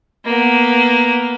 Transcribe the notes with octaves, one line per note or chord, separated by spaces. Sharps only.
A#3 B3